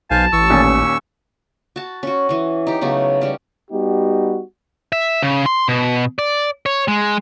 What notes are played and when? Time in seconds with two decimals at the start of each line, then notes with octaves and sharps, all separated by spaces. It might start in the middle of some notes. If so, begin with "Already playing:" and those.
0.11 B1 C5 F5 G#5 A5
0.33 A1 C#6 E6
0.50 D#2 A#2 C#4
1.76 F#4 A5
2.03 C#4 F#4
2.29 E3 C#4
2.67 D#4 G4
2.81 C#3 F#3 A3 B3
3.21 G3 C#4
3.71 G3 B3 D#4 F#4 G4
4.92 E5
5.23 C#3
5.46 C6
5.68 B2
6.19 D5
6.66 C#5
6.88 G#3